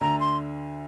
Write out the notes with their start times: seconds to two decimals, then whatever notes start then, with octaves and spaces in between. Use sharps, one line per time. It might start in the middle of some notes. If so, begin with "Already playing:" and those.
0.01 D2 D3 A#5
0.20 C6